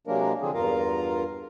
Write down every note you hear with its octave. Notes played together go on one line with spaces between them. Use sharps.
C3 F#3 G#3 A#3 D4 A#4
D3 F3 C4 D4 G#4
E2 G2 F4 A#4 F5 A#5